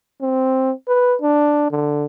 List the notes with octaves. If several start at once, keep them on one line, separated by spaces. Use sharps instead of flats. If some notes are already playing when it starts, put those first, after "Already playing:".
C4
B4
D4
D3